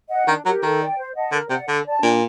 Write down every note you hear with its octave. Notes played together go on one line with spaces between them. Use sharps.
D#5 F#5
D#3 D4
F#3 G4 A#4
D#3 A4
D5 G5
C5
D#5 F#5 A5
D3 A#4
C3 D5 F#5
D3 A4
D5 A5
A#2 D4